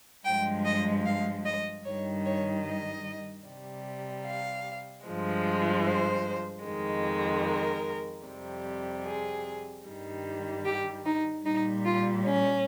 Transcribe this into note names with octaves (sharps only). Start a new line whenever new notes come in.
G2 F3 G#3 G5
D#5
F5
D#5
G2 D#3 G3 C#5
C#5
D#5
C3 G3
F5
G2 F3 G#3
C5
F2 D#3 G#3
A#4
F2 C3 G3
G#4
G2 D#3 G3
G4
D#4
A#2 G3 D#4
F4
C#4